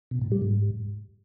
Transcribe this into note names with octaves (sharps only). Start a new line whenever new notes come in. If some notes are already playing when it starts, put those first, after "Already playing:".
B2
A2
G3
G#2